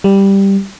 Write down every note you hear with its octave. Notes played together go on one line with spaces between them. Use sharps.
G3